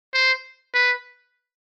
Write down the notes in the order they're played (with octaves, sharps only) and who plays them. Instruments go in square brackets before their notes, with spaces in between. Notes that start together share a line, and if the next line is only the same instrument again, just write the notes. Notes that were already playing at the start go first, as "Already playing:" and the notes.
[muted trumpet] C5
B4